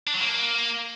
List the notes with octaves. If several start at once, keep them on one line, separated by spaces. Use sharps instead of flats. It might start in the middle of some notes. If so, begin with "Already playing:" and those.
D4
F#3
A#3